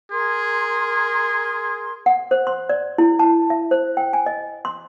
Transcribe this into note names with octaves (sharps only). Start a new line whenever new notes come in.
G#4 A#4 C6
F#5
C5
C6
D5
E4
A5
E5
C5
G5
G#5
D#5
C6